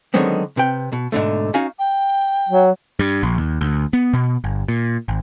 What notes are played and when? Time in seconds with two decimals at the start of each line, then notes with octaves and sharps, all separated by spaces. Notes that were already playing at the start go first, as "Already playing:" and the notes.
0.14 D3 D#3 F#3 G#3 B3 C4
0.57 C3 B4 G5
0.93 B2
1.12 G#2 B2 D3 A3
1.54 C#4 D#4 F#4 F5 G#5
1.79 G5
2.49 F#3
2.99 G2
3.23 A#1
3.38 D#2
3.61 D2
3.93 B3
4.14 B2
4.44 G1
4.68 A#2
5.08 G#1